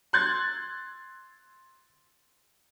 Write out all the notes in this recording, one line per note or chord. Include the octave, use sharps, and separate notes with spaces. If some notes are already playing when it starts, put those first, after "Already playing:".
C6 F#6 G#6 A6